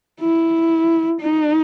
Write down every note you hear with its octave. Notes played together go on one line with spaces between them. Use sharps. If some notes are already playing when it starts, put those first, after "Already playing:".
E4
D#4